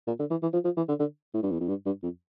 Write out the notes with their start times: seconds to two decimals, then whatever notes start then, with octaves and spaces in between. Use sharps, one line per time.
0.07 A#2
0.19 D3
0.30 E3
0.42 E3
0.53 F3
0.64 F3
0.76 E3
0.88 D3
0.99 D3
1.34 A2
1.43 G2
1.51 E2
1.60 F2
1.68 G2
1.86 G2
2.03 F2